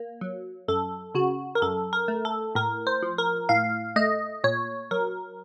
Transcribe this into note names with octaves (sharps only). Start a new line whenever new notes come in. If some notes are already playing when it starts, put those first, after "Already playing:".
Already playing: A#3
F#3
F#2 A4
C#3 F#4
A#4
F#2 A4
A#4
A3
A4
A2 A#4
C5
F3
A#4
A2 F5
A3 D#5
A#2 C#5
F#3 A#4